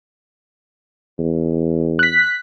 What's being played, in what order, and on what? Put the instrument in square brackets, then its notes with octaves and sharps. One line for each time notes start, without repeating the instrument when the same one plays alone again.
[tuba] E2
[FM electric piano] F#6 B6